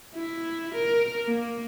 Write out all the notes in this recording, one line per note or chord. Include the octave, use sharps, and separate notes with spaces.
E4
A#4
A#3